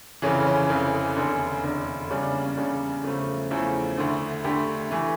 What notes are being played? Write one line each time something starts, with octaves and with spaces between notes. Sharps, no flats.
F1 F2 C#3 E3 C#4
C#4
F1 F2 C#3 E3 C#4
F1 E2 D3
F1 E2 D3
E2 C#3 G3 C#4
D4
A#3
C#4
E2 C#3 G3 D4
E2 C#3 F3 A3
E2 C#3 F3 A3 E4
D2 D3 A3
D2 D3 A3 G4
E3 A3